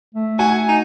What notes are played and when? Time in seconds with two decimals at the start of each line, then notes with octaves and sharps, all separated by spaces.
0.15 A3
0.39 F#4 G#5
0.68 D#4